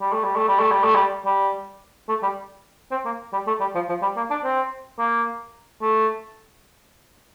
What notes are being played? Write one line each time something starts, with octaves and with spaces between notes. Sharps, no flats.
G3
A3
G3
A3
G3
A3
G3
A3
G3
G3
A3
G3
C4
A#3
G3
A3
G3
F3
F3
G3
A#3
D4
C4
A#3
A3